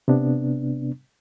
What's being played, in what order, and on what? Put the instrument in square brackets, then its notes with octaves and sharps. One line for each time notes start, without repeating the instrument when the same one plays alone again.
[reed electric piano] C3 B3 D4